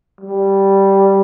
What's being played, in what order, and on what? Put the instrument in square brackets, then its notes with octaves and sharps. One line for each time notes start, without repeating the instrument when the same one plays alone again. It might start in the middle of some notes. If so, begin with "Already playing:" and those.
[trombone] G3